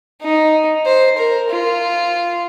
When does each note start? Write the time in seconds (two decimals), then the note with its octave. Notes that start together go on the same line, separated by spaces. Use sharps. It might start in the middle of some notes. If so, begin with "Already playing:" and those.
0.21 D#4
0.86 C5
1.18 A#4
1.50 F4